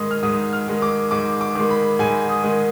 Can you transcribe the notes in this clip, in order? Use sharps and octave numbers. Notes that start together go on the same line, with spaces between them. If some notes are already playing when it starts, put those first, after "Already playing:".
Already playing: G#2 D#3 G#3 D#6
F6
G#2 D#6
F6
D#3 G#3
D6
G#2 D6
D6
D#3 G#3
B5
G#2 G#5
D#6
D#3 G#3